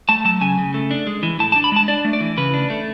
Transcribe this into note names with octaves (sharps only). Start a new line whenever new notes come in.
A3 A5
F#3 A5
C#3 G#5
C#3
A3
D4
G#3
E3
A2 A5
A5
D4
B5
G#3 A5
D4 D5
A3
D5
E3
C#3 B4
D4
A3